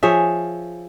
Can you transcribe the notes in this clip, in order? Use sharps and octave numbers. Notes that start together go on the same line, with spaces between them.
F3 G#4 C#5 E5